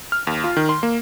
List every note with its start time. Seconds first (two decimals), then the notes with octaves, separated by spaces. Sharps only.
0.12 F6
0.27 D#2
0.44 F4
0.57 D#3
0.69 C6
0.83 A#3